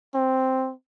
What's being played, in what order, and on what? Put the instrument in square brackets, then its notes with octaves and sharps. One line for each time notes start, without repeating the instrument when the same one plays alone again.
[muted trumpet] C4